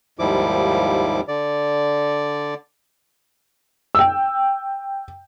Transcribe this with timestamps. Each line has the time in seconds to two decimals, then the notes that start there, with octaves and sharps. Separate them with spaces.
0.19 D#2 G#2 F3 G3 E4 D6
1.28 D3 D5
3.95 G5 E6